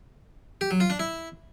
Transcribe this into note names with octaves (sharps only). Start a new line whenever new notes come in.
G4
F#3
F4
D4
E4